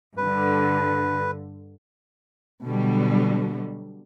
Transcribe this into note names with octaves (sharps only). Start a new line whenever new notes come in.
G2 D3 B4
B2 D3 F#3 G3